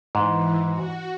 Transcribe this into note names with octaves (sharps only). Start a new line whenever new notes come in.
G#2 E3
F#4